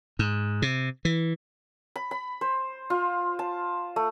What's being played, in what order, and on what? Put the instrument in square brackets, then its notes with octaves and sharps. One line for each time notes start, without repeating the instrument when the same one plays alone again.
[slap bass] G#2
C3
E3
[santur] B5
B5
C5
F4
A5
A3